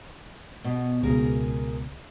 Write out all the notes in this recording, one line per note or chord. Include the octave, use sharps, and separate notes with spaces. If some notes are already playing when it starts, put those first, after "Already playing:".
B2
C#2 B2 G#4 A#4